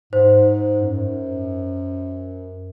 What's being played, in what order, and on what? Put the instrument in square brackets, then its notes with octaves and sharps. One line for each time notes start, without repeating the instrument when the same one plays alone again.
[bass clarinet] G#2 [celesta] C5
[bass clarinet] F#2